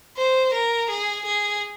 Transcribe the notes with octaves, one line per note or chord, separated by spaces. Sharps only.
C5
A#4
G#4
G#4